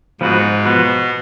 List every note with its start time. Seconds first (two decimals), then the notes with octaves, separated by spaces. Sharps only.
0.21 G#2 F3 B3 F#4 B4
0.65 B2 F3 B3 F#4 B4